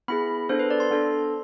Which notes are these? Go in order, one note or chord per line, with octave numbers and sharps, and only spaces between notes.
B3 E4 G#4 B5
B3 D4 A4 C5
B4
D5
C6
B3 D4 A4